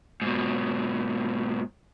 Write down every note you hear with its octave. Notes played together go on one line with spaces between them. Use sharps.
G#2 B2